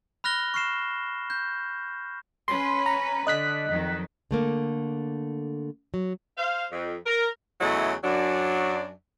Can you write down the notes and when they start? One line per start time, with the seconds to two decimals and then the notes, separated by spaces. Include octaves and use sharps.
0.24 B5 F6 F#6 A#6 G7
0.54 C#6 F6 C7 E7
1.30 G6
2.48 C#4 B4 C6
2.86 A#5
3.27 D3 D#5 F#6 B6
3.68 F2 D#3 F#3
4.31 D3 A3 A#3
5.94 F#3
6.38 C5 F5
6.72 F2
7.07 A#4
7.61 E2 C#3 F#3 A3 E4 D#5
8.04 F#2 F#3 D4